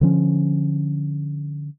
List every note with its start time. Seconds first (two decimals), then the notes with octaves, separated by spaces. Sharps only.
0.01 D3 F3 C#4